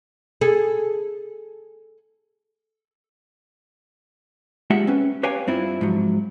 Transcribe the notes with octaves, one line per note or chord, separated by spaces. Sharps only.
G#4 A4
G#3 A#3 F4 G4 E5 F#5
C4 C#4 B4
G4 B4 C#5 F5 G5 G#5
G2 C4 E4 F4
G#2 F3 F#3